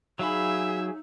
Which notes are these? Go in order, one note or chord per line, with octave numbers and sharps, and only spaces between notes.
F#3 D#4 G#4 E5 F5 B5